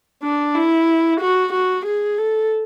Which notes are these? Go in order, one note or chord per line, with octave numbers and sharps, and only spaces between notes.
D4
E4
F#4
F#4
G#4
A4